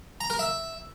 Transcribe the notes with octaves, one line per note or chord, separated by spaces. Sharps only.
A#5
A#4
E5